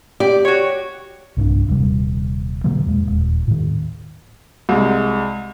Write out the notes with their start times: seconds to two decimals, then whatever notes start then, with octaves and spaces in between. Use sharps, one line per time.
0.20 G4 D5
0.45 F#4 C#5
1.37 B1 G2 C#4 D4
1.68 D#1 C3 G3
2.64 B2 D3 F#3 A#3
2.87 E2 G#3
3.07 D#1
3.48 A2 D#3
4.69 C2 G#3